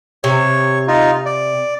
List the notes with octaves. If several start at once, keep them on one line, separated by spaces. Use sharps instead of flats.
C3 C#5
D#4 F4
D5